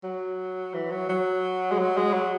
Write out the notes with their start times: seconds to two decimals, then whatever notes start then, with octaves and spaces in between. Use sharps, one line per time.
0.03 F#3
0.74 E3
0.91 F#3
1.09 F#3
1.72 G#3
1.78 F#3
1.97 G#3
2.13 F#3